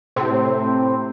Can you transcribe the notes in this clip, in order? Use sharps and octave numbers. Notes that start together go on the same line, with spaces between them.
A2 C3 C4